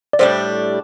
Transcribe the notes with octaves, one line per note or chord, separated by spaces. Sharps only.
D5
A2 G3 D4 C5